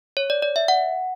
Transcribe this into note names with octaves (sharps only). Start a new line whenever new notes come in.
C#5
D5
D5
E5
F#5